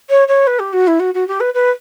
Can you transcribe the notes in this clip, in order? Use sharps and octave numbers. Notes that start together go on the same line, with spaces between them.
C#5
C#5
B4
G4
F#4
E4
F#4
F#4
G4
B4
B4